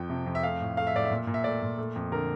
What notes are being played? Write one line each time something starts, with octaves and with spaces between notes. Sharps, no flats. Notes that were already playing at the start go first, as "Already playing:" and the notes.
Already playing: F2 F3 G5
C3
F2
E5
A3 F5
A2
A3 F5
E5
A2 D5
E5
A#2
A#2
E5
A3 D5
A#2
A3
F2
D3 A#4